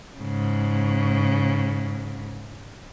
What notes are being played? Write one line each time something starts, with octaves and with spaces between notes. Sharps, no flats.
G#2 C#3